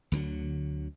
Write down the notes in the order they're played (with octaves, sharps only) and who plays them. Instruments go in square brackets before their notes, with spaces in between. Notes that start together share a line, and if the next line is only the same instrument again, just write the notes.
[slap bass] D2 D3 E3 F#3